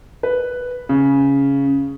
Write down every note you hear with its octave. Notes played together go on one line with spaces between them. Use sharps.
B4
C#3